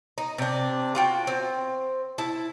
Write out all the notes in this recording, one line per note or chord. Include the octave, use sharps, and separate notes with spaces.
D#4
C3 D4
F4 F#4 G5
C4
E4 A5